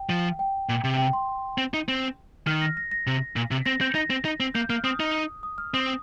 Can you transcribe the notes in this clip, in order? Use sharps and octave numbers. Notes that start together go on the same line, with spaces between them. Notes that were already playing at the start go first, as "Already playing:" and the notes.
Already playing: G5
F3
G5
A#2
C3
G5
C6
C4
D#4
C4
D#3 F6
A#6
A#6
A#6
C3
A#2
C3
C4 A#6
C4 G6
D#4 A#6
C4
D#4
C4
A#3 G6
A#3 F6
C4 D#6
D#4
D#6
F6
C4 D#6